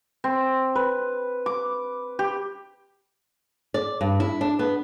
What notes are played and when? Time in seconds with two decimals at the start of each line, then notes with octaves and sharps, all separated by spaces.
0.24 C4
0.75 B4
1.46 D6
2.19 G4
3.74 D5
4.01 G2
4.20 E4
4.41 D4
4.59 B3